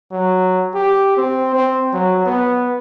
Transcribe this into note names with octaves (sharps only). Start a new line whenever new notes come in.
F#3
G4
C4
C4
F#3
B3